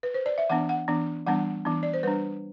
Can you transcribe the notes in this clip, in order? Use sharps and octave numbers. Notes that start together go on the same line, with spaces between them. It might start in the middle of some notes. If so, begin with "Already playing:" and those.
B4
C5
D5
E5
E3 B3 D4 F#5
F#5
E3 B3 D4
E3 G3 B3 D4 F#5
E3 B3 D4
D5
C5
G3 D4 B4